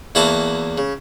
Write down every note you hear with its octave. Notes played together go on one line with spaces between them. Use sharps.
E2 A#3 E4 F#4 A5 A#5
C#3